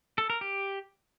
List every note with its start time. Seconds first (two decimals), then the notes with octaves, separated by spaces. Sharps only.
0.18 A4
0.30 A#4
0.41 G4